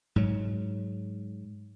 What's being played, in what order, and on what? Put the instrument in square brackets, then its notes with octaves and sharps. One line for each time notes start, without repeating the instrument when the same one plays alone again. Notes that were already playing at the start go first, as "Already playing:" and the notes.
[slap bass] G#2 F#3